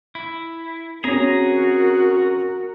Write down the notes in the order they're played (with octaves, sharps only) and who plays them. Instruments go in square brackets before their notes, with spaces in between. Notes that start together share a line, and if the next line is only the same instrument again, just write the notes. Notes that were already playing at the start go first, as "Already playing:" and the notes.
[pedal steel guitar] E4
[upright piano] C4 C#4 [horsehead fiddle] F#4 A#4 [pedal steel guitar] G#4 A#5